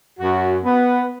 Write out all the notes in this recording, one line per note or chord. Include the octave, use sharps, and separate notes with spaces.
F#2 F#4
B3